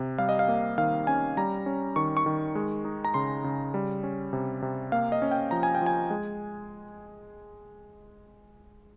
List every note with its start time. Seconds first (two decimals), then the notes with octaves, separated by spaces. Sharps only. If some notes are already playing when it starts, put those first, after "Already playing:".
Already playing: C3
0.18 G3 F5
0.29 D#5
0.39 F5
0.48 A#3
0.78 D#3 F5
1.07 C#4 G#5
1.37 G3 A#5
1.66 C#4
1.96 D#3 C#6
2.17 C#6
2.26 D#3
2.55 G#3
2.85 D#4
3.05 A#5
3.14 C#3 C6
3.44 C#3
3.74 G3
4.03 C#4
4.33 C3
4.62 C3
4.92 A#3 F5
5.12 D#5
5.22 C#4
5.31 G5
5.51 F3 A#5
5.63 G#5
5.75 G5
5.81 F3 G#5
6.10 G#3